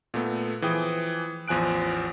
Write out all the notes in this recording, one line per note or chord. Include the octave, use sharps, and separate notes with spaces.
A#2 A3 B3
E3 F3 G#4 G5 D#6
A1 E2 F3 G#5 F#6 D7